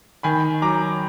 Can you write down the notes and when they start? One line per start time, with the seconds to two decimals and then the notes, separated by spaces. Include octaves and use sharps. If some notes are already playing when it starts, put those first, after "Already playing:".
0.23 D#3 G#5 B5
0.62 F#3 A#5 D6